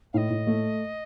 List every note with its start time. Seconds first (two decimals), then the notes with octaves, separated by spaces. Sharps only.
0.13 A2 D#5 F5
0.30 A2
0.47 A3